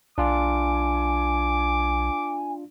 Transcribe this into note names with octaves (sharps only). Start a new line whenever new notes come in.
B1 D4 F4 G#5 D6